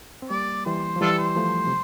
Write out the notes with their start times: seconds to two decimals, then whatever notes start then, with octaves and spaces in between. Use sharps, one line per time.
0.22 C4
0.30 G3 A#3 D5
0.65 E3 G3 C5
0.96 F3
1.01 E3 G3 D4 F4 A4
1.19 C5
1.36 F3 A3
1.67 C3